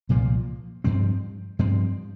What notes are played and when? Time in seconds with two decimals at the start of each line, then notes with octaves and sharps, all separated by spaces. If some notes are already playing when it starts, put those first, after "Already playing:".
0.09 C2 A#2 F3 A#3
0.84 G2 F3 C4
1.59 G2 F3 C4